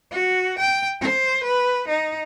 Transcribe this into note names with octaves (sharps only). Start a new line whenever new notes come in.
F#4
G5
C5
B4
D#4